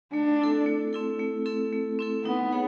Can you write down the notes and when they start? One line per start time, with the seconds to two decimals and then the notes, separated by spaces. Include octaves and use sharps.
0.13 A3 D4
0.40 C4 E4 A4
0.66 A3
0.93 C4 E4 A4
1.19 A3
1.46 C4 E4 A4
1.73 A3
1.99 C4 E4 A4
2.25 B3 D#4
2.52 G#4 C#5 F#5